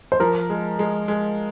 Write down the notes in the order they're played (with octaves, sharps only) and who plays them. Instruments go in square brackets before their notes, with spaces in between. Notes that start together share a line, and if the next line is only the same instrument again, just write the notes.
[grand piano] C5
[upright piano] F3 [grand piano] A#4
[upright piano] G#3
G#3
G#3